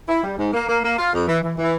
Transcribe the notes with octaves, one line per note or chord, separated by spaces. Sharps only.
E4
G3
G#2
A#3
A#3
A#3
F4
F2
E3
E3
E3